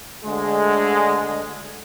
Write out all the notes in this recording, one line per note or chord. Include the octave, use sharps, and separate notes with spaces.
D2 D3 G#3